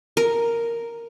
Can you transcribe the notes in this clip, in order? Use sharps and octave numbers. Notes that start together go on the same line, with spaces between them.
A#4